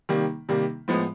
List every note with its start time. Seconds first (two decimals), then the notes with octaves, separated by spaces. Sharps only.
0.09 C3 D#3 G3 A#3
0.49 C3 D#3 G3 A#3
0.88 A2 F3 G#3 B3